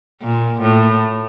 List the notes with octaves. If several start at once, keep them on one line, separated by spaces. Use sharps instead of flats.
A#2
A2